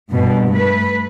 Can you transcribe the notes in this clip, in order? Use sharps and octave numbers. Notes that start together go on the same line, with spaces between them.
G2 B2
A3 B4